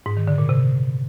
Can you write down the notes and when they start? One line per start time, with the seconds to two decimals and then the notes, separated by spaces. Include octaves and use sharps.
0.06 G#2
0.17 D#3
0.27 D3
0.38 A#2
0.49 C3